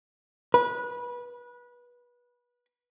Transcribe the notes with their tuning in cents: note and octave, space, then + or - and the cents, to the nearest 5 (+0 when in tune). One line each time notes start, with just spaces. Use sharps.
B4 -25